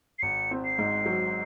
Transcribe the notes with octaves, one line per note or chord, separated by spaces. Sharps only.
C7
G#1 C#7
C4
C7
G#2
F#3